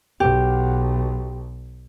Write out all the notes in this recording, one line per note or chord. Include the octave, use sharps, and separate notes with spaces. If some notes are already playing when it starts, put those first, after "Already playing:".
B1 G4